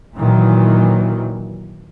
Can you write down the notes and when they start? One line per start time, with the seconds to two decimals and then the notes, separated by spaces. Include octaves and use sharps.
0.18 A#2 D#3 E3 F#3